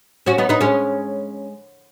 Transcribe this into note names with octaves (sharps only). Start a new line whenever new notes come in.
C#4 F#4
B3 D#4
B3 D#4
G#3 C#4